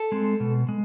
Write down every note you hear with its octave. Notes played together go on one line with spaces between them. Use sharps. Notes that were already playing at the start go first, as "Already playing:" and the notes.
Already playing: A4
G#3 C4
B2
G#3